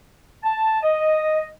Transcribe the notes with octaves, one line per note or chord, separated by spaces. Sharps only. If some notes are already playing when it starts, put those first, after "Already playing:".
A5
D#5